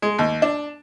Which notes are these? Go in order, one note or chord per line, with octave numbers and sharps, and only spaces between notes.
G#3
D#2
D4